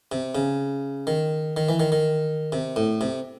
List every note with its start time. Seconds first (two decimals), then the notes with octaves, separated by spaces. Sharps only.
0.12 C3
0.35 C#3
1.07 D#3
1.57 D#3
1.69 E3
1.80 D#3
1.92 D#3
2.52 C3
2.76 A2
3.01 C3